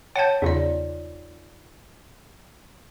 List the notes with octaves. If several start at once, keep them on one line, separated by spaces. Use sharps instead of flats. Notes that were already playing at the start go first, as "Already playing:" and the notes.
C#5 F#5 G5 A5 G6
E2 C#3 D#4 F4 D5